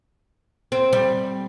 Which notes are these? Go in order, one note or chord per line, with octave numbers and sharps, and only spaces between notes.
C4
G3